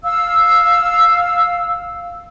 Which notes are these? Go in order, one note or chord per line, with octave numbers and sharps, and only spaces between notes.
F5 E6